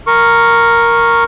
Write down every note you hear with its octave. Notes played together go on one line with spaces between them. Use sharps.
A#4 C#6